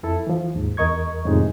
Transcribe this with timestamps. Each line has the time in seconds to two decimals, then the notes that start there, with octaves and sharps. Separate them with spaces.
0.03 F2 E4 A4
0.27 E3 F3
0.54 D#2 G#2
0.77 E2 A#4 D#5 C#6 G#6
1.26 F2 A2 C3 D#3 G#3 D#4